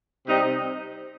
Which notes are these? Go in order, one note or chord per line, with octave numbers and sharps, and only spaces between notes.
C3 G3 C4 D#4